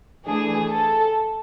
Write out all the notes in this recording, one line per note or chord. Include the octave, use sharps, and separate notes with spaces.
E3 A3 D4 G#4
A4